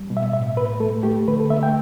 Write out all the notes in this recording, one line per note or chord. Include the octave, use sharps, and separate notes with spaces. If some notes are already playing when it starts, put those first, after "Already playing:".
Already playing: G3
B2
E5
A2 E5
A2 B4
A3 A4
A3 G4
D3 B4
A4
A3 E5
G5